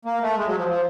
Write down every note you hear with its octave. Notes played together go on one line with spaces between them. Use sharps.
A#3
A3
G#3
F#3
F3
F3